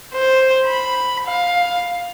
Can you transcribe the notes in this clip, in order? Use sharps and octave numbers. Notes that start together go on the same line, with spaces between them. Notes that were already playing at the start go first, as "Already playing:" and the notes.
C5
B5
F5